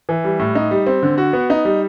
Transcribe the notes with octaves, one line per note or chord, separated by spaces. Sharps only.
E3
G3
A2
D#4
G3
C4
D3
F#4
B3
D#4
G3